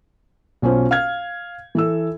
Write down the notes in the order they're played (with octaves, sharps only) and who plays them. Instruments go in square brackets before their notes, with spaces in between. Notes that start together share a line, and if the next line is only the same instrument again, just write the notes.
[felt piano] B1 C#4 F4 C5
F5 F6 G#6
E3 A4 E6